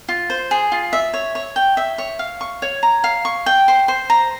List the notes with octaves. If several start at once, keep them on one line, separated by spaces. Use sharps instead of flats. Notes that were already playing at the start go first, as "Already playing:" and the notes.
F4
C5
G#4
F4
E5
C#5
C#5
G5
E5
C#5
F5
C#6
C#5
A#5
F5
C#6
G5
C5
C5
A#5